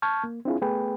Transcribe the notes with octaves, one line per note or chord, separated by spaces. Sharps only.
A5 C#6 F6 G6 G#6
A#3
C4 D4 E4 F4 G#4
A3 B3 G#4 B4 G5